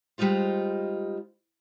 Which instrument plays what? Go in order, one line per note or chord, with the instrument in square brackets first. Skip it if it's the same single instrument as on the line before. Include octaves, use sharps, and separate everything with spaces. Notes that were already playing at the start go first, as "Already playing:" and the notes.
[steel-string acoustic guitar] G3 G#3 D#4 F4 C5